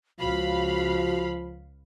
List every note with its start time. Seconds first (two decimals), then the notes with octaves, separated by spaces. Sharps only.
0.20 C#2 F3 F#4 F5 B5